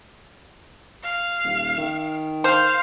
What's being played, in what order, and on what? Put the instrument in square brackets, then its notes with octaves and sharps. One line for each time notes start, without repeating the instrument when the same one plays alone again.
[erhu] F5
[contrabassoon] D#1
D#3
[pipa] C5 [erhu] F5